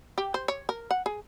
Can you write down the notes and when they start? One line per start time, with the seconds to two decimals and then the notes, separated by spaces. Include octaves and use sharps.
0.18 G4
0.34 C5
0.48 C#5
0.69 A#4
0.91 F#5
1.06 G#4